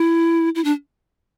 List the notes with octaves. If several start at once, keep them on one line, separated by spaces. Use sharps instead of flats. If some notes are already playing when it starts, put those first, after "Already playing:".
Already playing: E4
E4
D4